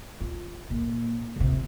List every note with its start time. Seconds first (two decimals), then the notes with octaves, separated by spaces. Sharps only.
0.20 F4
0.70 A#2
1.36 A#1 C3